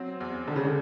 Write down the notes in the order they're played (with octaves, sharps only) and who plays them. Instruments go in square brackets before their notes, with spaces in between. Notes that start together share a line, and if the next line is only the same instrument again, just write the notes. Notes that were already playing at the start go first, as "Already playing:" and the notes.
Already playing: [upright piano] F#3 C4
E2
[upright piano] E1 [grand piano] D3
[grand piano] C#3
D3